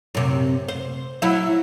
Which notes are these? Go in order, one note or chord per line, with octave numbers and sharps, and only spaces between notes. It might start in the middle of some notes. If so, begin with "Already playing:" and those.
F#2 C3
C5
F#3 E4